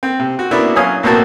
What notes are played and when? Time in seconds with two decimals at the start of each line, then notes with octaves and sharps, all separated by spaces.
0.03 C4
0.20 C3
0.39 F#4
0.51 A#3 B3 D4 E4 F#4
0.75 F#3 C#4 F5 G#5 D#6
1.03 B1 A2 A#3 C4 F#4 A5